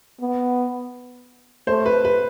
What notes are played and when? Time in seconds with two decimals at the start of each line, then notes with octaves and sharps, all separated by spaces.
0.20 B3
1.67 A3 C5
1.86 B4
2.05 B4